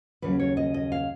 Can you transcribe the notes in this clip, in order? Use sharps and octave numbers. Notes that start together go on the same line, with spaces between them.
D#2 C#3 F#3 B4
C#5
D#5
D#5
F5